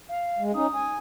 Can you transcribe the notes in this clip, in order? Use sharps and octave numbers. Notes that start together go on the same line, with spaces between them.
F5
G#3
C#4 D#4 D#6
G#5